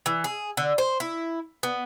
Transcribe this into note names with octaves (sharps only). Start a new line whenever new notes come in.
E3
G#4
D3
C5
E4
B3